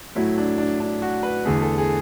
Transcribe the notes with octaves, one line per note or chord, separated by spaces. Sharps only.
A2 F#3 A3 E4
D4
D4
D4
F#4
B4
E2 D3 A3 G#4
A4
G#4